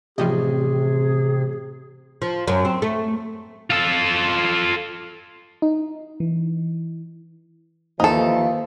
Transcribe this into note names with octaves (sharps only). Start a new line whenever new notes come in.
A1 C3 F3 G3 G#4 D#5
F3
F#2
C4
A3
F4 A4
D#4
E3
D#2 E3 F3 D#4 A4